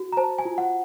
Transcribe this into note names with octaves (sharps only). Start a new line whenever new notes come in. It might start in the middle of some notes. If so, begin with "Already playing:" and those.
Already playing: F#4
A#5
C5 A5
G#5
F4
F#5